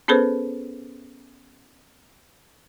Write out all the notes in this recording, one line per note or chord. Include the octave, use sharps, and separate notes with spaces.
B3 C#4 G#4 A4 B4 C5